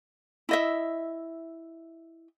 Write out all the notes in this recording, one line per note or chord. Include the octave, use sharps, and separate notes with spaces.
E4 D#5 E5